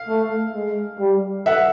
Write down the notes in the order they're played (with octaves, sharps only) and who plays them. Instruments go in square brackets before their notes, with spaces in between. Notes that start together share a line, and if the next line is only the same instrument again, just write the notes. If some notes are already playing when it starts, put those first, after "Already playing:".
Already playing: [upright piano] F5
[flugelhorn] A3
G#3
G3
[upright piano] E5 F#5